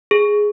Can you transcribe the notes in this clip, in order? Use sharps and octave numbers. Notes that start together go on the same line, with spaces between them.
G#4